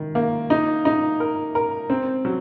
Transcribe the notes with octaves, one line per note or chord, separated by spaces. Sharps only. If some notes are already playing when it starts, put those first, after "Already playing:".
Already playing: D#3
A#3
D#4
D#4
A#4
A#4
C4
F#3